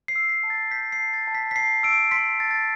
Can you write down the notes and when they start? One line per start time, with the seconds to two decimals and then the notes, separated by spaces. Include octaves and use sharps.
0.08 C7
0.16 E6
0.29 B6
0.43 A5
0.50 A6
0.71 G6 B6
0.92 C7
1.00 A5
1.14 A6
1.27 A5
1.35 B6
1.51 B6
1.56 A5 C7
1.83 E6 D7
2.11 C6 B6
2.40 A5 A6
2.51 A6